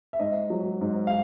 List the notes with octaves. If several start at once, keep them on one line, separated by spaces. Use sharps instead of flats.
E5
G#2 D#5
F#3
G#2
F5